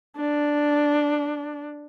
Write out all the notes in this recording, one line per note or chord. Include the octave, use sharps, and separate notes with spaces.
D4